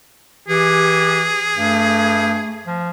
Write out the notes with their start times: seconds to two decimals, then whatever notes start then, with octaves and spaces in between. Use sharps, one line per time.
0.49 E3 G4 G#4
1.57 G2 A3
2.66 F3